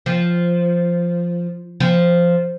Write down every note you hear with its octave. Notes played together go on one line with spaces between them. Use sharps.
F3
F3